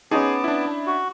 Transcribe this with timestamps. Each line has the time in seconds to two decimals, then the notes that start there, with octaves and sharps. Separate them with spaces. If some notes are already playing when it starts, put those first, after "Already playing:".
0.11 B3 C#4 D#4 G#4 A5 D6
0.44 D4 E4
0.87 F#4